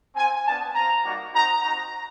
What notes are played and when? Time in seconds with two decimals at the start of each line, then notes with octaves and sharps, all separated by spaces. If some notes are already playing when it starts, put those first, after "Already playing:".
0.15 C4 F4 G#5
0.44 B3 D4 F4 A5
0.74 C4 F4 A#5
1.03 G3 A#3 D#4 F#4
1.32 C4 D#4 F#4 A#5
1.61 C4 D#4 F#4 A#5